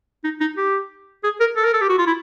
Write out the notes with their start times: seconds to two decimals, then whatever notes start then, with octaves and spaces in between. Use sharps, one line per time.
0.24 D#4
0.40 D#4
0.57 G4
1.24 G#4
1.40 A#4
1.56 A4
1.64 A#4
1.73 A4
1.81 G4
1.89 F#4
1.98 F4
2.07 E4